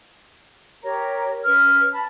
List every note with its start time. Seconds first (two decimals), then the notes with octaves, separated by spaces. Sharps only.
0.83 G4 A#4 C#5 A#5
1.44 C#4 B4 F6
1.92 A5 B5